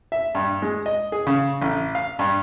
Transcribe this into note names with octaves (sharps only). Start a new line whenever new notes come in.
E5
G2
G#3
D#5
G#4
C#3
A1
F5
G2